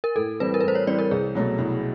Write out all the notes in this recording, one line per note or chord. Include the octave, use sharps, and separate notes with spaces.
A#4
A2 A4
E3 G3 C4 B4
A#4
B4
A2 C5
C#5
E3 G3 C4 D5
A#4
C2 G#4
B2 F#3 A3
C2